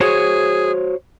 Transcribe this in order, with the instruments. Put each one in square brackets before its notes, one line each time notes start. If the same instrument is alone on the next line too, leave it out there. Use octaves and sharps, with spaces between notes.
[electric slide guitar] F#4 C5 C#5 [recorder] G#4